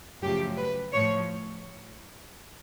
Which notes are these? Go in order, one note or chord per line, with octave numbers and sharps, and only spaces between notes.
F#2 C#3 F3 A3 G4
B4
A2 F3 A3 C#5